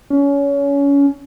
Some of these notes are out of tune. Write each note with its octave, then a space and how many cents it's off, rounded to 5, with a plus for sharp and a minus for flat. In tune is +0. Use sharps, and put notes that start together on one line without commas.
C#4 +25